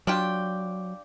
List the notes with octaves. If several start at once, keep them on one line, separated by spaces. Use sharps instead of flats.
F#3 D4 F4 G4